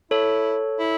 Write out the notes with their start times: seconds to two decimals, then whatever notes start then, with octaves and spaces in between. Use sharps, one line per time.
0.11 E4 A4 C#5
0.79 E4